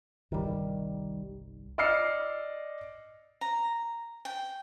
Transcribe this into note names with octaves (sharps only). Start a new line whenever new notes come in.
G1 C2 D#3 G3
D5 D#5 E6 F6 C7 C#7
A#5
G5